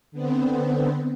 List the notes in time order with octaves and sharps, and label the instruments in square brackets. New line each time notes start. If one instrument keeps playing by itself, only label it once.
[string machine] D3 B3 C4